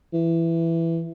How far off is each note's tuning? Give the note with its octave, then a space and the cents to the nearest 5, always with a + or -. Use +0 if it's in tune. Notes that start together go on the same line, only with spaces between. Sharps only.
E3 +10